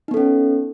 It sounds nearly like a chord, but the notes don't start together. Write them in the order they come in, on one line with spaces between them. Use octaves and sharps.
D#4 B3 A4 C#4